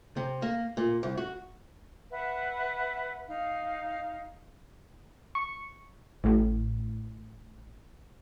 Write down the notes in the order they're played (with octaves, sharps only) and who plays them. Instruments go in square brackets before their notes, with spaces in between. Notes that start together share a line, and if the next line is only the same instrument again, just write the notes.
[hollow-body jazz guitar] C3
A#3
A#2
C2
F#4
[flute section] B4 E5 F#5
D#4 F5
[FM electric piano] C#6
[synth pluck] A1 A2